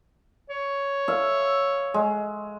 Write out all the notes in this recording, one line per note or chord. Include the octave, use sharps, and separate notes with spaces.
C#5
E5 F5
G#3